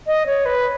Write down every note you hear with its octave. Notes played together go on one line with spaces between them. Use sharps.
D#5
C#5
B4